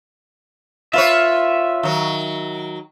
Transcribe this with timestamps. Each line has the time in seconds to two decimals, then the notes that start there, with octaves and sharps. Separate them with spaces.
0.93 F4 B4 C#5 E5
1.83 D#3 F#3